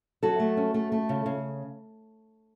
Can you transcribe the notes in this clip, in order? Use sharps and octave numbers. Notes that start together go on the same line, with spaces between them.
F#3 F#4 A4
A3
C#4
A3
A3
C#3
C#3